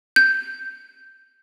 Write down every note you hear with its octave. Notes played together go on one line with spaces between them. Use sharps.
G6